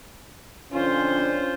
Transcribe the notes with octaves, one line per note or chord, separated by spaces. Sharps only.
F2 D3 C#4 F4 C5